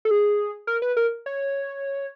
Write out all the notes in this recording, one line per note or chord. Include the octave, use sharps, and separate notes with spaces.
A4
G#4
A#4
B4
A#4
C#5